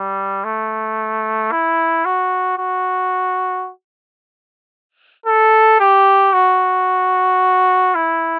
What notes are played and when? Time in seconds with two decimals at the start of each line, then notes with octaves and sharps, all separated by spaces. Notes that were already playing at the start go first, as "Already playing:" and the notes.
Already playing: G3
0.44 A3
1.51 E4
2.05 F#4
2.58 F#4
5.26 A4
5.80 G4
6.33 F#4
7.95 E4